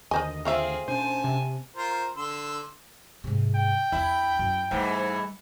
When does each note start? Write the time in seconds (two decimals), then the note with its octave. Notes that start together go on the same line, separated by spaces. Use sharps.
0.11 D#2 D3 A#4 C5 D#5 G#5
0.45 A3 C4 F4 G#4 E5 F5
0.88 B2 C#4 D4 C5 G#5 A5
1.24 C3
1.76 F4 A#4 C5
2.17 D3 C6 E6
3.24 G#2 C3
3.56 G5
3.92 E2 D4 E4
4.39 F#2
4.71 G#2 E3 G3 A3